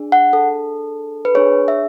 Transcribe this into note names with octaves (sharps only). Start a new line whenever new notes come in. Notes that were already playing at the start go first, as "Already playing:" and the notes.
Already playing: D4 G#4
F#5
A4
B4
D4 G#4 C#5
E5